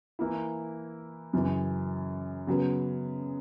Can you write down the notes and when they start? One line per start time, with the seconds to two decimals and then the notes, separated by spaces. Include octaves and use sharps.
0.19 E3 A#3 E4
1.33 F#2 C#3 E3
2.47 C#3 F#3 B3